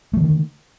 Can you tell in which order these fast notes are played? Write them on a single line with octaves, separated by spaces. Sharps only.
A3 F3 D3 D#3